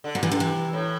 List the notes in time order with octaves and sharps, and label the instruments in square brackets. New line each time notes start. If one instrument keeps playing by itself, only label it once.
[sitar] D3
[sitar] C3 [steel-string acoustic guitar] F#3
[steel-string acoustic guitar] E3
D3
E3
[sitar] A2